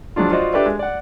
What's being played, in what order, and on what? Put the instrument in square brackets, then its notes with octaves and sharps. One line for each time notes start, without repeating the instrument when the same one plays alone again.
[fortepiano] F3 F#3 G#3 D4 F4
F4 F#4 C5 D5 D#5
D4 G4 A4 B4 D5 E5
G#3
D5 F#5